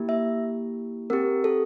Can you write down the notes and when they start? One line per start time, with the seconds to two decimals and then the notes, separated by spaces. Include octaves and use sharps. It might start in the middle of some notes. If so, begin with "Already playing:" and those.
Already playing: A#3 E4 G4
0.09 E5
1.10 C4 G4 A#4
1.44 A4